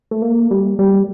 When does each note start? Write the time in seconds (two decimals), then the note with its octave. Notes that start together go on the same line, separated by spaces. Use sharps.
0.11 A3
0.22 A#3
0.51 G3
0.79 G3